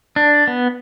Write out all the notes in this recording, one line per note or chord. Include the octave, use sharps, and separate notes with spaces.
D4
B3